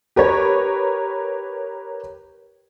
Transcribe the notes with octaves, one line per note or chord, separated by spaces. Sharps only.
G4 A#4 B4 C#5